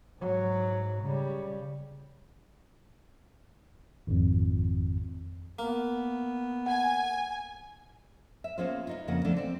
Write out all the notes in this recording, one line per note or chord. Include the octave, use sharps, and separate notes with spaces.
G#2 F#3
C#3 G3
G#1 F2
A#3 B3
F#5 G#5
E5
A#3 B3 C#4 F4 G#4 C5
B3 D#4 F4
F2 C#3 A#3 F#5
F3 A3 B3 D4 F4
C4 D5